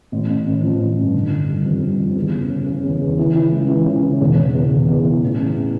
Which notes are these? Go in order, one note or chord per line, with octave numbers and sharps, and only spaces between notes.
A1
A1
A1
F3
A1
G2
D3
D3
G3
F2
G3
F2
E2
C#3
C#3
C#3
E2
E2
E3
E3
C#2
E3
C#3
C#3
E1
E1
E2
E1
E2
E3
A1
A1